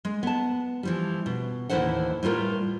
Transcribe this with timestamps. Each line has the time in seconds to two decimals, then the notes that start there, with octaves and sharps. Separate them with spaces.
0.05 G#3
0.23 B3 A5
0.83 E3 F3 G3
1.26 B2
1.69 D#2 A2 C3 E3 C5 F#5
2.23 A2 G3 F4 A#4 B4